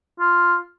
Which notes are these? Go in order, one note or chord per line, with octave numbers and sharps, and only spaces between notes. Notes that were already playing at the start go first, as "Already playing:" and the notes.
F4